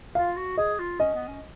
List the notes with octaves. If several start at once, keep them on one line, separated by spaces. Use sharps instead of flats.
F4 F5
F#4
G#4 D#5
F4
C#4 D#5
B3
C#4